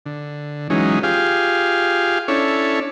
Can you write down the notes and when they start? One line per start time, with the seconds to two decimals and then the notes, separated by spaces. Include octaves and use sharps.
0.06 D3
0.70 E3 F#3 G#3 C#4 D#4
1.03 F4 G4 G#4 F5
2.28 C#4 D4 E4 A4 C#5